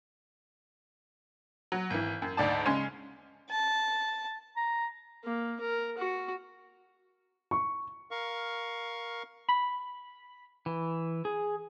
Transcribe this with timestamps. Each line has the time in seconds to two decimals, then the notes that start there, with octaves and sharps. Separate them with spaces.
1.72 F#3
1.90 G#1 E3
2.22 F#2
2.37 D2 G#2 D5 A5
2.66 C#3 G#3 C#4
3.50 A5
4.56 A#5
5.25 A#3
5.61 A#4
5.98 F#4
7.51 C#6
8.11 A#4 F5 C#6
9.49 B5
10.66 E3
11.25 G#4